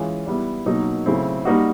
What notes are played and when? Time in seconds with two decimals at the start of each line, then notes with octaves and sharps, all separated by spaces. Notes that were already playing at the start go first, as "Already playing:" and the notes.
Already playing: E3 G#3 C#4 F4 G#4
0.26 G3 B3 E4
0.66 B2 F#3 A#3 D#4
1.06 C#3 F#3 A3 C4 E4
1.45 G3 A#3 D#4 F#4